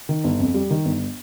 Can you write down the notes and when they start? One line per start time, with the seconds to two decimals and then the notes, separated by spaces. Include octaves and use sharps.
0.09 D#3
0.24 G1
0.40 F2
0.54 G3
0.70 D#3
0.85 G1